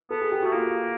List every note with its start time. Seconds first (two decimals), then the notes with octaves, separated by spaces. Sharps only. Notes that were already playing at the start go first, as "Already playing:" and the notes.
0.10 B3 A4
0.21 G#4
0.32 G4
0.42 F#4
0.45 A3
0.52 A#3 F4